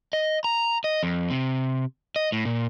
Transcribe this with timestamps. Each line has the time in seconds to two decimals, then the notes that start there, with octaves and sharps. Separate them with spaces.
0.13 D#5
0.44 A#5
0.84 D#5
1.03 F2
1.30 C3
2.16 D#5
2.32 A2
2.45 A#2